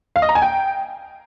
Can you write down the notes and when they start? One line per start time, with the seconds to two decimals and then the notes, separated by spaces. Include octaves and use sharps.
0.16 F5
0.22 D#5
0.29 A#5
0.35 G#5
0.42 G5